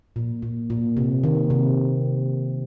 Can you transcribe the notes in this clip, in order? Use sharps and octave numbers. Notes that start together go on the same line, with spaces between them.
A#2
A#2
A#2
C3
D#3
C3